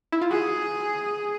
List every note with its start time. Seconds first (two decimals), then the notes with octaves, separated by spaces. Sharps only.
0.12 E4
0.21 F4
0.31 F#4 G#4